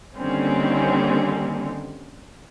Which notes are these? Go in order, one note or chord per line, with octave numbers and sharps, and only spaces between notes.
D3 D#3 G3 A#3 C4 C#4